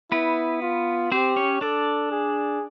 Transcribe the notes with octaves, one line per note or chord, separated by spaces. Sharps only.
B3 E4 B4
F4
C4 G4 C5
C#4 C#5
D4 A4 D5
G#4